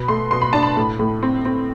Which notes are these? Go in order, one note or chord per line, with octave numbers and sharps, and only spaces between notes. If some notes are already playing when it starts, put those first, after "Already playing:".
Already playing: B2 B5
A3 C6
B2 C6
B5
D4 A5
B5
A2
A2
C4
C4